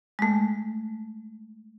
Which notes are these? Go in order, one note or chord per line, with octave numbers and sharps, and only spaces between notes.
G#3 A3